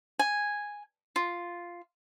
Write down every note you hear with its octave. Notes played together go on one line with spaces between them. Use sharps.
G#5
F4